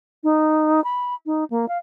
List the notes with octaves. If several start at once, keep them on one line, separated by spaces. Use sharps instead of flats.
D#4
B5
D#4
A#3
F5